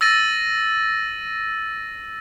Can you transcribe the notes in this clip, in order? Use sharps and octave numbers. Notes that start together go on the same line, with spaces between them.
E6 A6 A#6 D#7